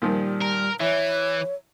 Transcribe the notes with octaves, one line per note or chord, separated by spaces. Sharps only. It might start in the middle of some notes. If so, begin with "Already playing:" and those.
A#2 D#3 F3 G3
A#4
E3 E4 C#5